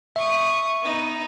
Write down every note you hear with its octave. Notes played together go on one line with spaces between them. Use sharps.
E5 C#6 D#6
B3 D#4